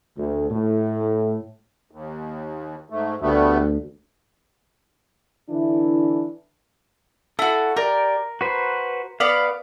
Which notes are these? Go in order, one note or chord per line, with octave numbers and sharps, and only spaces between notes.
D2
A2
D#2
G#2 A3
D2 G3 A3 B3
D3 E3 D4 E4
E4 F#4 A4
G4 A#4 D5
F#4 B4 C5
B3 B4 D5 F5